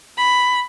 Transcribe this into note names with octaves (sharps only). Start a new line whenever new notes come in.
B5